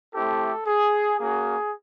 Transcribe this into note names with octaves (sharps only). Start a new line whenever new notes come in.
A3 C4 E4 G4 A4
G#4
A#3 C#4 F#4 G#4